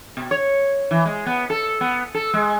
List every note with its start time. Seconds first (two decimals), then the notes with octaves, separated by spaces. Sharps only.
0.17 B2
0.31 C#5
0.91 E3
1.05 G#3
1.26 B3
1.50 A4
1.81 B3
2.14 A4
2.34 G#3